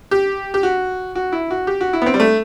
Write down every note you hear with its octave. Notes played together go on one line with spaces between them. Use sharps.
G4
G4
F#4
F#4
E4
F#4
G4
F#4
E4
B3
C4
G3
A3